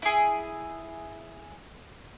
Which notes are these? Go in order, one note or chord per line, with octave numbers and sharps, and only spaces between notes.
E4 G#4